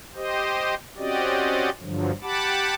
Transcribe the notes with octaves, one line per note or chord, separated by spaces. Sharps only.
G4 C5 D#5
C4 C#4 F#4 G4 D5 D#5
G2 D3 F3 F#3
G4 F#5 A5 B5 D6